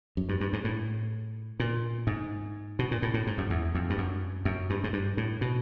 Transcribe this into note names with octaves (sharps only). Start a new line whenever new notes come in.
F#2
G2
G2
G#2
A2
A#2
G#2
B2
A#2
A2
A2
G#2
F#2
E2
F2
G2
F#2
F#2
G2
G#2
G2
A2
B2